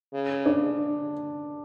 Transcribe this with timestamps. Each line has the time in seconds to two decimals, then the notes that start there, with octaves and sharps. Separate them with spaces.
0.13 C#3
0.46 D4